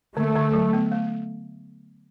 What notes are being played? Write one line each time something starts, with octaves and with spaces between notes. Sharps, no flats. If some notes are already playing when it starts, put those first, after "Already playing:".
D3 A3
D3
F#3
B3
A3